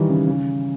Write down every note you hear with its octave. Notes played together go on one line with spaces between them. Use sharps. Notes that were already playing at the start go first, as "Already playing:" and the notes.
Already playing: D#3 E3 G3
C#3
C#3